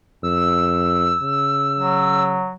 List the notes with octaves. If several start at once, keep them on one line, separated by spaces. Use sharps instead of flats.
F2 E6
C#3
F#3